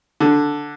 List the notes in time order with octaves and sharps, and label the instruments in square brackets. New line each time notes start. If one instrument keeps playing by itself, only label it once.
[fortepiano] D3